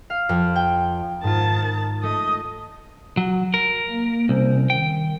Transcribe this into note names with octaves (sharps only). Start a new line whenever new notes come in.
F5
F2
G5
G#2 D#3 F4 A5
A3 D#5
F#3
A#4
A#3
C2 C#4 C5
D#3 G5